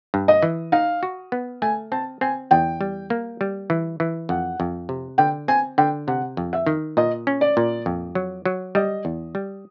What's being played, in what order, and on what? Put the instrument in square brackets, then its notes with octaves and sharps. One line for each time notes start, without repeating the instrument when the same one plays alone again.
[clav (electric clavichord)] G2
[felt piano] D#5
[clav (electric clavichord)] E3
[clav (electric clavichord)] D#4 [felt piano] F5
[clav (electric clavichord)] F#4
B3
[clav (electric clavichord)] A3 [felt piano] G#5
[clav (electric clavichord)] C4 [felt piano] A5
[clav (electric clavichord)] C4 [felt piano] G#5
[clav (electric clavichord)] E2 [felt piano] G5
[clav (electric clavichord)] G3
A#3
G3
E3
E3
[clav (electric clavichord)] F2 [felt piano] F#5
[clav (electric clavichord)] F2
C3
[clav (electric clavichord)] D3 [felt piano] G5
[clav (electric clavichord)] C4 [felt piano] G#5
[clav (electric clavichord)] D3 [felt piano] G5
[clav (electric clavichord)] C3 [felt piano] F#5
[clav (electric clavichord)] F2
[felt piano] E5
[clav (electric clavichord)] D#3
[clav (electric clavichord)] A#2 [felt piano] D#5
[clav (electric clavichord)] C#4
[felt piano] D5
[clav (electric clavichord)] A#2
F2
F#3
F#3
[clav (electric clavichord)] G3 [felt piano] D#5
[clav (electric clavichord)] E2
G3